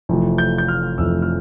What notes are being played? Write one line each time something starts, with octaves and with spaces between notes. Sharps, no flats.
F1 F2 E3 A3
G6
G6
F6
F1 F2 E3 A3 E6
F6